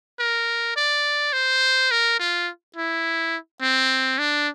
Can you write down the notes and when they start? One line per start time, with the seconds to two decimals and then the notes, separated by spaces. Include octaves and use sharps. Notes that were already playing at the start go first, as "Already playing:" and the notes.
0.20 A#4
0.76 D5
1.33 C5
1.91 A#4
2.19 F4
2.76 E4
3.61 C4
4.18 D4